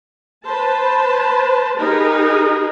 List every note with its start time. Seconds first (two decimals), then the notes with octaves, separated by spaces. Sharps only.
0.45 B4 C5 A5
1.77 D#4 G4 G#4 A#4 B4